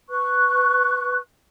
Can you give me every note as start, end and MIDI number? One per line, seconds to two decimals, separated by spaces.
0.09 1.18 71
0.09 1.18 85
0.09 1.18 90